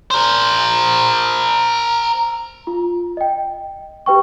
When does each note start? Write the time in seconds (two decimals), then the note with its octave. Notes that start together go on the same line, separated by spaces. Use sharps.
0.11 A#4 C5
2.67 F4
3.17 D#5 G5
4.06 G4 B4 G5 C#6